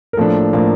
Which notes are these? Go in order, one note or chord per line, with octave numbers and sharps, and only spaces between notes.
A#4
A2 F3 A#3 D4 A4
A2 F3 A#3 D4